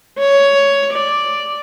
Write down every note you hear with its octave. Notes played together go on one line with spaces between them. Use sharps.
C#5
D5